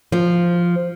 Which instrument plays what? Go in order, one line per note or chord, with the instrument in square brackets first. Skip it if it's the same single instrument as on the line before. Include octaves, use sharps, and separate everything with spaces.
[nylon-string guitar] F3